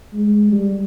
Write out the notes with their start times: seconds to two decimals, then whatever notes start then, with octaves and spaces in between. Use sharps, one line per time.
0.13 G#3
0.52 G3